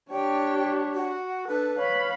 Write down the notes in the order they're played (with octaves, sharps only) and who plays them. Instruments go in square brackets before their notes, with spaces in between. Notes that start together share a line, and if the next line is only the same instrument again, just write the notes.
[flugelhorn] D4 [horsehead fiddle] G4 C#5 [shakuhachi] G5
[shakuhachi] F#4
[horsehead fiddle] D4 [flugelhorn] A4 [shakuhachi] B4
[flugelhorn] C#5 [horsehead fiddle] F5 B5